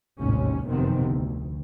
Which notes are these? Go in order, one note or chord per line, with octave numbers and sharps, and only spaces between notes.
A1 D#2 G#2 C3 C#4
F1 F#2 C3 D#3 B3 C4
D2